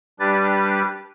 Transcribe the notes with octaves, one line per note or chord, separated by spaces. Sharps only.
G3 D4 G4 B4 A6